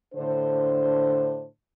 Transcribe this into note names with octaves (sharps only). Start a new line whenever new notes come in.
A2 D3 D4 C5